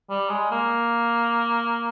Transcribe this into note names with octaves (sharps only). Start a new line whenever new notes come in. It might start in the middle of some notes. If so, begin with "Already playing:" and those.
G3
G#3
A#3